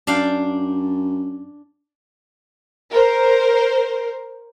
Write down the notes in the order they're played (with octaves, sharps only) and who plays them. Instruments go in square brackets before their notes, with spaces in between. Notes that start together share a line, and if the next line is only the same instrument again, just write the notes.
[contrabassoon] F#2 [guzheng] D4 F5 G5
[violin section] A#4 C5